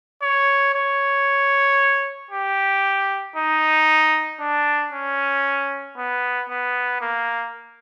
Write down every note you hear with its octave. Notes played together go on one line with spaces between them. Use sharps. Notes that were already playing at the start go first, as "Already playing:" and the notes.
C#5
C#5
G4
D#4
D4
C#4
B3
B3
A#3